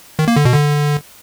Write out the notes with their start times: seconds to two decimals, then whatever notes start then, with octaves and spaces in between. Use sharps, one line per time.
0.19 D#3
0.28 A#3
0.36 D3
0.45 B2
0.54 D3